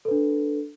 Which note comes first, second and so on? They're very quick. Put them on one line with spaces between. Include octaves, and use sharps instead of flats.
A4 B4 D4